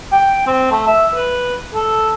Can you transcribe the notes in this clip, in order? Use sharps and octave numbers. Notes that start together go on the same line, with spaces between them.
G5
C4
A3
E5
B4
A4